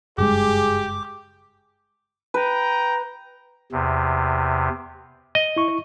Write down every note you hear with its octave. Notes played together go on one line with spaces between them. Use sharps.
F#1 G2 G#3 G4 G#4 D6
B4 G5 A#5
E2 C3
D#5
E4 C#6